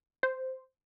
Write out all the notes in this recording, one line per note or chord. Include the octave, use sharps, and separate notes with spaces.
C5